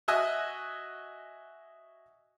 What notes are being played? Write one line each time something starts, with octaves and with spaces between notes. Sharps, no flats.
F#4 D#5 E5 G#5 D#6 F#6